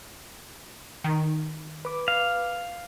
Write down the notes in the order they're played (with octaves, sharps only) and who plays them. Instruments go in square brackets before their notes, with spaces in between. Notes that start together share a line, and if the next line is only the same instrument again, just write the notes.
[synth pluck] D#3
[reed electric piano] B4 D6
[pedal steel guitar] F5